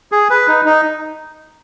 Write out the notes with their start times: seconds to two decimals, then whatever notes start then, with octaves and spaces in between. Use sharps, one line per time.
0.12 G#4
0.30 B4
0.47 D#4
0.65 D#4